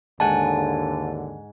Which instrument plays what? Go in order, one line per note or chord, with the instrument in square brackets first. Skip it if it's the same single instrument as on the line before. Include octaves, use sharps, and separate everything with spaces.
[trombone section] D#2 D3 [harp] G#2 F#5 G#5 [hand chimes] A5